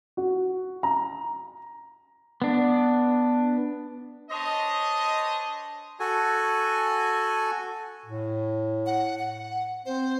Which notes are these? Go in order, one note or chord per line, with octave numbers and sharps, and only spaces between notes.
F#4
A#5
B3 D4
D4 C5 C#5 D#5
F#4 A4 G#5
A2
F#5
F#5
C4 C5